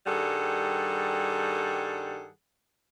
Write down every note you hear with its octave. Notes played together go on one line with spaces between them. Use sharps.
G2 D#3 G3 G#4 A4 F#5